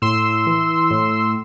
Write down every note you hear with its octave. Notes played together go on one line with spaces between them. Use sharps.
A2 C6 E6
E3
A2